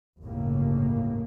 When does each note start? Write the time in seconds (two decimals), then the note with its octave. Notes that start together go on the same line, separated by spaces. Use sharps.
0.21 G1 D#2 A2 C#3 A#3